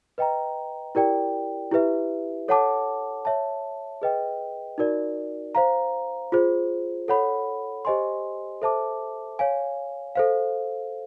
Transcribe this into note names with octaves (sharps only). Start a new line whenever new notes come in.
B4 D#5 G5 A#5
E4 G4 A#4 D5 G5
E4 G4 B4 E5
A4 C#5 F#5 A5 D6
C#5 E5 A5
G#4 B4 D#5 G5
D#4 F#4 A#4 D5
C5 F5 A#5
F4 G#4 C5
A4 C#5 F#5 B5
G4 C5 D#5 G#5 C6
A4 C5 E5 A5 D6
C#5 F5 G#5
A4 C5 F5